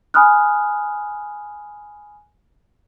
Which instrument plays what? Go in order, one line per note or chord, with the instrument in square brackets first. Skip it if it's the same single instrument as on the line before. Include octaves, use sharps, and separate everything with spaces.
[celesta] G#5 B5 D#6 F6 F#6